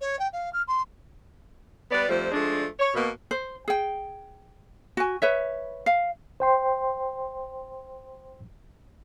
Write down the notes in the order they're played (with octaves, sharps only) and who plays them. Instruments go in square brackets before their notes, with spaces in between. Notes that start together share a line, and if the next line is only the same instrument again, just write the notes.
[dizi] C#5
G5
F5
F6
C6
[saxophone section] G3 B3 B4 D5
F2 F3 G3 A3 C5
F3 G#3 A3 D4
C#5
B2 A#3
[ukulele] C5
G#4 G5
F#4 G#5
B4 C#5 E5
F5
[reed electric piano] C5 G5 C6